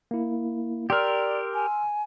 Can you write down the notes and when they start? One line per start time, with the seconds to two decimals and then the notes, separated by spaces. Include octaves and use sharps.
0.11 A#3 E4
0.90 G4 A#4 D5 C6 E6 F6
1.54 G#5